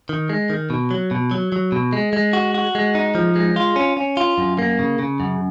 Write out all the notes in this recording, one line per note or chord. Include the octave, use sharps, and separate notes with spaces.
D#3
G#3
D#3
B2
F#3
B2
F#3
F#3
B2
G#3
G#3
F#4
F#4
G#3
D#4
F3
G#3
F4
C#4
C#4
F4
F#2
A#3
C#3
C#3
F#2